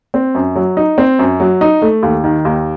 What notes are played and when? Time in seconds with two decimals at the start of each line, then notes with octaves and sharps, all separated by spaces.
0.14 C4
0.35 F#2
0.56 F#3
0.77 D#4
0.98 C4
1.19 F#2
1.40 F#3
1.61 D#4
1.82 A3
2.03 D#2
2.24 D#3
2.45 D#2